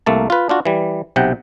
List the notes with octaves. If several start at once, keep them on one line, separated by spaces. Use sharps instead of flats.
C2 A3 A#3 A5
F4 B4
D4 F4 F#4
E3 G3
B1 C3 F#5 G5